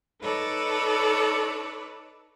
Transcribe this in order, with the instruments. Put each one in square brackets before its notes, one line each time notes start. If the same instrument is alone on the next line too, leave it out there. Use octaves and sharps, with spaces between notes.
[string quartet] D#4 A4 B4 C#5 D5